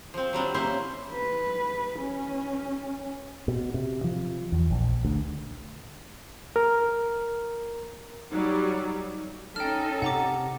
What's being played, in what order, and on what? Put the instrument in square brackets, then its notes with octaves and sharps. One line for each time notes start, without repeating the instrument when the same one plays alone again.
[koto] F3 C4
F#3 G3 C4 D4
A#3 C#4 E4 C5
[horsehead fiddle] B4
C#4
[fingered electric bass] B2
C3
F3
E2
A#1
D2
[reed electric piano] A#4 F6
[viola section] F#3 G3 [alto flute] D#4
[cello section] C#4 D#4 A4 [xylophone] G5 F6
[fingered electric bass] C3 [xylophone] F#5 A#5 D6